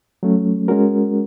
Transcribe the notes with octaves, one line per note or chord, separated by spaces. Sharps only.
F#3 A3 C#4
G#3 C#4 F#4 A#4